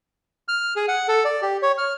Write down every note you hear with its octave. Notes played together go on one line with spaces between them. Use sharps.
F6
G#4
F#5
A4
D5
G4
C#5
F6